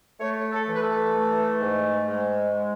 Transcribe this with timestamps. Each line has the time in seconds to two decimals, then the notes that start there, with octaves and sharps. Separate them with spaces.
0.20 A3 C#5
0.51 A4
0.68 E3
0.75 B4
0.83 A4
1.14 A3
1.61 G#2
2.06 G#3
2.53 G#3